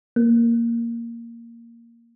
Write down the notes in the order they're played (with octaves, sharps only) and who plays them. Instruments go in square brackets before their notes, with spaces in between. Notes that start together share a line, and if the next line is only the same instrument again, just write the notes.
[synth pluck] A#3